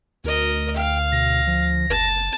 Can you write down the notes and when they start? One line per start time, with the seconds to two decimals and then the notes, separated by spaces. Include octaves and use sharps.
0.24 D2 A#4 D#5
0.76 F5 G5
1.12 B2 A#6
1.47 F3
1.89 F#1 A5